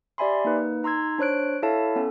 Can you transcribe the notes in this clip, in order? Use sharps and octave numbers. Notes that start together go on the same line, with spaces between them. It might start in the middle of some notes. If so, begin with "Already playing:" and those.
G4 D5 E5 G#5 B5 C6
A#3 D#4 B4
D#4 A#5 C6 E6 G#6
D4 C5 C#5 F#6 D7
E4 A4 C#5 E5 F5 A5
B3 C#4 A4